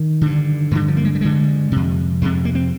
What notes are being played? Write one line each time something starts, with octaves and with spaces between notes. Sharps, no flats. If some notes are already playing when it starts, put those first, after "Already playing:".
Already playing: D#3
G2 D3
G2 D3 D#3
F3
A#3
G#3
G3
G2 D3 G#3
F2 C3
F2 C3 G#3
A#3
C4